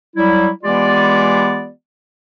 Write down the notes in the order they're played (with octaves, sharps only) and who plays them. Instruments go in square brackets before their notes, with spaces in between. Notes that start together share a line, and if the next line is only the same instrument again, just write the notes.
[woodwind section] F#3 G3 E4
E3 G#3 B3 F4 G4 D5